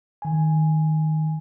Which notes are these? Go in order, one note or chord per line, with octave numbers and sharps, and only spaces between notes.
D#3 G#5